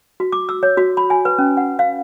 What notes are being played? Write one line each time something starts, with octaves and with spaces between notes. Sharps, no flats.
F#4
D6
E6
C#5
F#4
B5
G#5
B4
C#4
F#5
F5